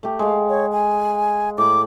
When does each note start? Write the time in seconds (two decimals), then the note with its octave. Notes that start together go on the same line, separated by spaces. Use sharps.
0.03 A3 G4
0.19 G#3 F5
0.49 C#5
0.72 G#5
1.58 A2 B5 D6